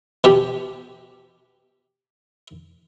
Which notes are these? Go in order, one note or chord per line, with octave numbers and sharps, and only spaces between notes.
B2 G4